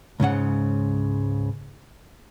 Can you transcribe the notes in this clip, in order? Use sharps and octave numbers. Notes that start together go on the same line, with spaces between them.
C#2 G#2 C#3 F#5